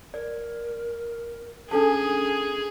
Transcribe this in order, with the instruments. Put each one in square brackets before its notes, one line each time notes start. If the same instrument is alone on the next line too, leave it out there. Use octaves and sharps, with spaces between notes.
[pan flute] A#4 [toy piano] D5
[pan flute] C#4 [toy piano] D4 A4 A5 [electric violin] G#4